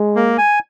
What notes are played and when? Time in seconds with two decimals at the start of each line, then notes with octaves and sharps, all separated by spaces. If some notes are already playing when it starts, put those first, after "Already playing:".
Already playing: G#3
0.16 A#3
0.38 G#5